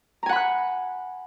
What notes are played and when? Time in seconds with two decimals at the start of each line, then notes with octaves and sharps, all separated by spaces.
0.23 A#5
0.26 G#5
0.29 F#5
0.33 B5
0.36 F#6